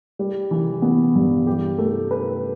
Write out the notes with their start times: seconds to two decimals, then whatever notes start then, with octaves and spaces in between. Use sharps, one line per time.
0.19 G3
0.51 E3
0.82 B3
1.15 G2
1.47 G4
1.78 A3
2.11 B4